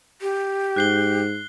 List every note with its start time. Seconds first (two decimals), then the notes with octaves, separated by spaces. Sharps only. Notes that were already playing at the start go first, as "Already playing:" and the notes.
0.22 G4
0.76 G#2 F#6 C7 G7